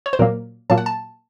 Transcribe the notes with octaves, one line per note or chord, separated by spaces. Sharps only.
C#5
C5
A#2 F#3 A#3 A#4
A#2 F#3 A#3 A5
F#5
A5